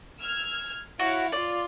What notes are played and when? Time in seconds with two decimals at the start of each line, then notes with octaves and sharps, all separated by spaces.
0.21 E6 F6 G#6
1.00 E4 F#4 C#5 F5
1.32 F4 D5